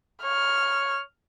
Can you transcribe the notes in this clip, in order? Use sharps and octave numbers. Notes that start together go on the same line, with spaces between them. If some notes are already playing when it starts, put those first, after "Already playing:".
C#5 F6